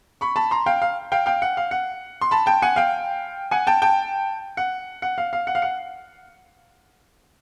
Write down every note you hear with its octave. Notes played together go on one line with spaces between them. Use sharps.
B5 C#6
A5 B5
A#5 C6
F5 G5
F5
F5 G5
F5 G5
F#5
F5
F#5
C6
A5 B5
G5 A5
F#5 G#5
F5 G5
F#5 G#5
G5 A5
G5 A5
F#5
F#5
F5
F5
F#5
F5
F#5